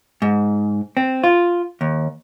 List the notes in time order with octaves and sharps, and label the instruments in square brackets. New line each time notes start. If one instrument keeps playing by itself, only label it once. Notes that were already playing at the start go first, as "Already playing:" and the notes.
[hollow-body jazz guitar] G#2
C4
F4
D#2